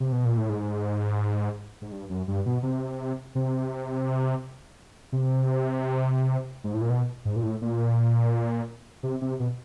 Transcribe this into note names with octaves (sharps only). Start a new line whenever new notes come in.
C3
B2
A#2
A2
G#2
G#2
G2
F#2
G2
B2
C3
C3
C3
G#2
A2
A#2
B2
G#2
A#2
A2
A#2
C3
C3
B2